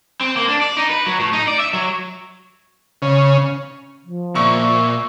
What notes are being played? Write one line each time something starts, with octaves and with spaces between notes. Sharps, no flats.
C4
A#3
D4
D5
D#4
B4
F#3
A2
D#4
D5
E5
F#3
C#3
F3
A#2 E5 C#6